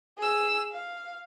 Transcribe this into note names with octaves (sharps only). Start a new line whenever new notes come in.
G#4 E6
F5